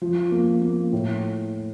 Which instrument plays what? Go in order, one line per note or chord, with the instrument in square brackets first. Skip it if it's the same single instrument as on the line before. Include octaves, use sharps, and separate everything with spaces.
[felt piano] F3
A#3
A#3
A2